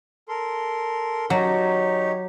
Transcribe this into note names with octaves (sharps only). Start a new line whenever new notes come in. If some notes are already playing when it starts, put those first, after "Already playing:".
A4 A#4 C6
F#3 D#4 G4 C#5